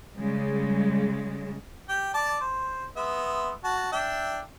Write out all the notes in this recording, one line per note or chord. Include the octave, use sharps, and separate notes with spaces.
C#3 G3 G#3
G4 G5
D5 A5 D6
C5
G#3 B3 E5
F#4 A5
D4 E5 G5